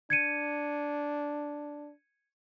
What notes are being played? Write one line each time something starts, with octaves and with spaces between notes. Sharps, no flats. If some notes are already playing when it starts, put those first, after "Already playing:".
D4 G#6 C#7 D#7